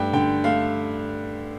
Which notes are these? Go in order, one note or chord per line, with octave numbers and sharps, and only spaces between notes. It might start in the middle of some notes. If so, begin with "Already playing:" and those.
Already playing: G2 A3 G5
D3 G5
A3 F5